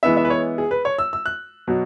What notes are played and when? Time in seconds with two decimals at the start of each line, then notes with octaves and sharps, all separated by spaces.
0.03 E3 G#3 B3 E4 E5
0.17 E5
0.25 B4
0.30 C#5
0.58 G#4
0.71 B4
0.85 C#5
0.99 E6
1.13 E6
1.26 F#6
1.68 B2 F#3